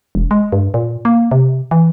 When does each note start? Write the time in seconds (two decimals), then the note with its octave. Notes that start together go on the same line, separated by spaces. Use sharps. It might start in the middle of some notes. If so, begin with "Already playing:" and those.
0.15 E1
0.31 G#3
0.52 G2
0.74 A#2
1.05 A#3
1.31 C3
1.71 E3